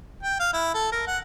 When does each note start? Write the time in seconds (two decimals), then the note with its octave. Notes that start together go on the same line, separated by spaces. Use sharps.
0.23 G5
0.40 F5
0.53 E4
0.74 A4
0.92 A#4
1.07 F#5